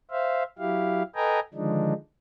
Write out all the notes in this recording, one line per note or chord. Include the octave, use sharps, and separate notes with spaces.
C5 E5 F5
F#3 E4 G4 F5
A4 B4 D#5 G5 G#5 A#5
D3 D#3 F3 G#3 D4 D#4